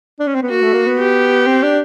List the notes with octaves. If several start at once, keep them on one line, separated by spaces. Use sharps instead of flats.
D4
C#4
C4
B3
A#3 F#4
A3
A#3
B3
G4
C4
D4